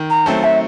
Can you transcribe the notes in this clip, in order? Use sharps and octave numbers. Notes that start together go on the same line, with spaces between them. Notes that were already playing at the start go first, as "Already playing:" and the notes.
Already playing: D#3
A#5
F#3 A3 C4 A5
E5